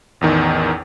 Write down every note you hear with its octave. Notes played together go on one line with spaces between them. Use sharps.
A1 E2 D#3